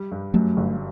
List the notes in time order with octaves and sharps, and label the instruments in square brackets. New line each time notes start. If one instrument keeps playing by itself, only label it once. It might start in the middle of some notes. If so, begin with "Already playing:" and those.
Already playing: [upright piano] G3
G2
[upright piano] F#2 [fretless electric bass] F#3 A3
[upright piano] G1